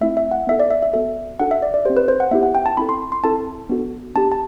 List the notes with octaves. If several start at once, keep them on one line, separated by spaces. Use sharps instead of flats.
A3 C4 E4 E5
E5
F#5
B3 E4 A4 E5
D5
E5
E5
B3 F#4 A4 E5
D4 F#4 A4 F#5
E5
D5
D5
C4 G4 C5
B4
C5
F#5
B3 E4 G4 E5
F#5
G5
A5
C4 E4 A4 B5
C6
C6
C4 E4 A4 A5
B3 D4 F#4 A4
B3 D4 G4 A5
A5